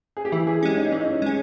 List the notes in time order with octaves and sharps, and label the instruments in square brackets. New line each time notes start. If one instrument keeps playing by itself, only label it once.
[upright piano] G#4
G4
[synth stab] E3 [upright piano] E4
[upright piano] G#4
[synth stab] G#3 C#4 [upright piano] G4
[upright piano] D#4
[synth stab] E3 [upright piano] D#4
[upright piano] C#4
D#4
[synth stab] G#3 C#4